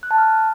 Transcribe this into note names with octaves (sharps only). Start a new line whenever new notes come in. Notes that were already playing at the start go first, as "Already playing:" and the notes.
F#6
A5
F6